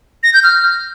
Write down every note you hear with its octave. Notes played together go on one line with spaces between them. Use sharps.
A#6
G6
F6